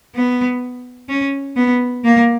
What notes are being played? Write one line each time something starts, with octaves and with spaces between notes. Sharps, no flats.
B3
C#4
B3
A#3